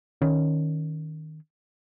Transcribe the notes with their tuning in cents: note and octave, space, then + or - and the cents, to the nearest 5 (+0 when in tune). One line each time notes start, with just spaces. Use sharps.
D#3 +0 C#4 +0